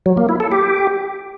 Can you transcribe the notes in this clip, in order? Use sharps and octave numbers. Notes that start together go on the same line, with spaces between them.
F#3
A#3
E4
A4
G4